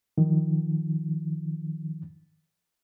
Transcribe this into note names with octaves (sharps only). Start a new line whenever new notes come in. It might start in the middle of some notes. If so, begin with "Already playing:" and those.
D#3 F3